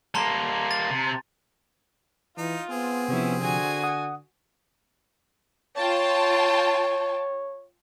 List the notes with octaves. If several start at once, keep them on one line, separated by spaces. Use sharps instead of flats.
G3 A#3 A5 A#5 C6
A6
C3
E3 D#4 F4
B3 C4 G#4
C3 F3 C#4 E4
D3 F#4 G#5
F#5 D#6
F4 C#5 G5 A5